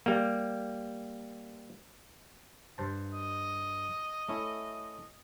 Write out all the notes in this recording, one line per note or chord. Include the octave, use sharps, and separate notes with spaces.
G3 A#3
G2 C5 A5
D#5
A3 C#4 E4